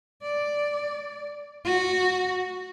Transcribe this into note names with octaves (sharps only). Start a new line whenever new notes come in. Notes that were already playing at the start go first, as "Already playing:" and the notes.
D5
F#4